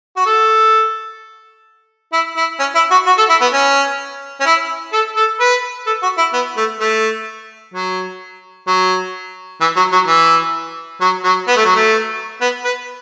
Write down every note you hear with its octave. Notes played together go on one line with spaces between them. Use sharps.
F#4
A4
E4
E4
C#4
E4
F#4
F#4
A4
E4
B3
C#4
C#4
E4
A4
A4
B4
A4
F#4
E4
B3
A3
A3
F#3
F#3
E3
F#3
F#3
E3
F#3
F#3
B3
A3
F#3
A3
B3
B4